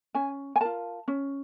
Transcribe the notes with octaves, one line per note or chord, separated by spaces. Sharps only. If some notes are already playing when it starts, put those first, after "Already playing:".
C#4 G#5
G#5
F4 A#4 A5
C#4